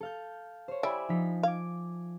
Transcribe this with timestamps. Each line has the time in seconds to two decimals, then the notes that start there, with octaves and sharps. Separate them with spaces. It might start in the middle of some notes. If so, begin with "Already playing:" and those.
0.01 A4 F5 G6
0.68 C5 C#5
0.83 G3 E4 D5 E5 G#5
1.09 F3 D#4 B6
1.43 F5 D6 G#6